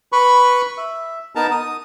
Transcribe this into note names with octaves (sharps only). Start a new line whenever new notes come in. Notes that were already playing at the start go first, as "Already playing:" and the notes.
B4 B5 C#6
E5
B3 D#4 A#4 A5 A#5
D#6